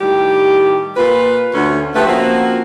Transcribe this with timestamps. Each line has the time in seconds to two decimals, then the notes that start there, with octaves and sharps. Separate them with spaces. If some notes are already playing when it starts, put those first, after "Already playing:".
0.01 A2 D#3 G3 G4
0.96 A#2 F4 B4
1.53 D2 C#4
1.95 C#3 F3 A3 G4 B4
2.07 F3 A#3 C4 C#4 F#4